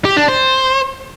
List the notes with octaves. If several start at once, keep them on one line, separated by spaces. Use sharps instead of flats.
G4
D4
C5